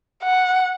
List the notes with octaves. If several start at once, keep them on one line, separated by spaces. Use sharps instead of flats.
F#5